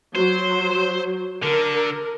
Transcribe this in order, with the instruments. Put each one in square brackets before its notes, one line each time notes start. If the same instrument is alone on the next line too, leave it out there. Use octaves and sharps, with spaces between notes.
[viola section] F#3 [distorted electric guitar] C5
[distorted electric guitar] D3 [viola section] A#4